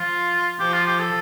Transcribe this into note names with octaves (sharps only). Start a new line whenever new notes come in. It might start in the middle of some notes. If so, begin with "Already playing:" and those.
Already playing: F3 F4
F3 G4
F4
G4
A4